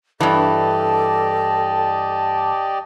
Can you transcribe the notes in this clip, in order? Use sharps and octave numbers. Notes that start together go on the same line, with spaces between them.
G2 E3 G4 A4 D5 D#5 A5